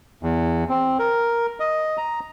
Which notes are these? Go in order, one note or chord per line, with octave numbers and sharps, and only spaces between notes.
E2
C4
A#4
D#5
A#5